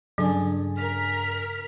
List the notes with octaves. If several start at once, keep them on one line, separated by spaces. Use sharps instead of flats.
G2 C#3 F#3 D4 G#4 A4 G#5
A#4 F6 B6